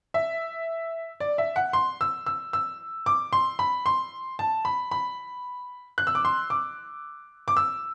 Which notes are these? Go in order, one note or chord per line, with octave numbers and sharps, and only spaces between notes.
E5
D5
E5
F#5
C6
E6
E6
E6
D6
C6
B5
C6
A5
B5
B5
F#6
E6
D6
C6
D6
D6
E6